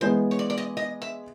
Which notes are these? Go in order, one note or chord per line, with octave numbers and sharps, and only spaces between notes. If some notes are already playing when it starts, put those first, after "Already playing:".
E3 G#3 B3 C5
C#5
D5
D5
D#5
D#5
E5